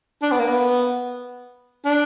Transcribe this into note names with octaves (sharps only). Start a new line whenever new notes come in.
D4
B3
A#3
B3
D4